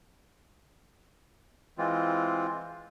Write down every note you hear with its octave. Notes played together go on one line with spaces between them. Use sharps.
E3 G#3 C4 F4